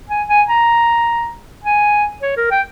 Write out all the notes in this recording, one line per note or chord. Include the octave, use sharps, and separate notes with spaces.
G#5
G#5
A#5
G#5
C#5
A#4
G5